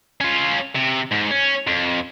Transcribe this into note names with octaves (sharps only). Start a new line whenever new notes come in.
C#4 F4
C3
G#2
C#4
F2